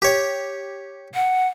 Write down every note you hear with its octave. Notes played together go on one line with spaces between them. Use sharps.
G4 C#5
F#5